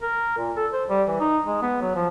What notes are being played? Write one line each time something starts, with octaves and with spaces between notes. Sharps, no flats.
A#4
A#2
A4
C5
G3
E3
D#4
G#3
B3
F#3
F3